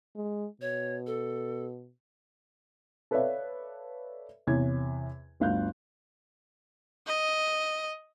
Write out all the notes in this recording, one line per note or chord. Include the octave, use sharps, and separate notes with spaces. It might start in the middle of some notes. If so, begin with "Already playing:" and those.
G#3
B2 C#5
A4
A4 B4 C#5 D5 E5 F5
E2 C3 C#5 G#6
G1 D2 F5 F#6 G6
D#5